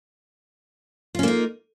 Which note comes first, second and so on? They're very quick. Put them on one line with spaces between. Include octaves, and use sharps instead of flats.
F4 C#4 A#3 D#4